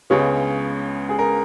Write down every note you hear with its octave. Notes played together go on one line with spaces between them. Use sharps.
C#2 C#3 G#3 B3 C#5
G#4
A#4